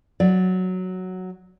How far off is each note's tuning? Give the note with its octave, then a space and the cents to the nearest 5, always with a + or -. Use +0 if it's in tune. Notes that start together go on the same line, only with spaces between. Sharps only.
F#3 +0 D5 +0